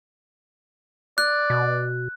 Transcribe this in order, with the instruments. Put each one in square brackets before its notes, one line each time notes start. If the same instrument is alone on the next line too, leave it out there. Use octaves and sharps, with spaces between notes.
[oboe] D5 [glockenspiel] F#6
[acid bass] B2